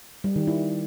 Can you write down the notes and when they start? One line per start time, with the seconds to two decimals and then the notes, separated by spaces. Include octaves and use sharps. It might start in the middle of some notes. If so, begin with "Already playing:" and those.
0.24 G3
0.36 D#3
0.47 E4